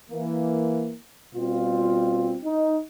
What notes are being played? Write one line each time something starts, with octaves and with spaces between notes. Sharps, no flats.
E3 A#3
B2 G3 C4 F4
D#4